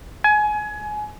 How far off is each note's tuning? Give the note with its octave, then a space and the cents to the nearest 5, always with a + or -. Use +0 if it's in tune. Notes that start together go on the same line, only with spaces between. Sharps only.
G#5 +25